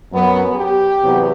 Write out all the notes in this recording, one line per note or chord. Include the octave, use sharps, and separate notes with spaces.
F#2 F#3 B3
G4
E2 C3 F#3 B3